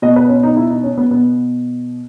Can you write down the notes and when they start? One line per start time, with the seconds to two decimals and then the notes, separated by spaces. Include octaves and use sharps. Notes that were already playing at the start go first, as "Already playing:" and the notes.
0.02 B2 D#5
0.16 B4
0.29 C#4
0.43 D#4
0.57 E4
0.70 D#4
0.83 C#4
0.98 B3
1.11 B2 B3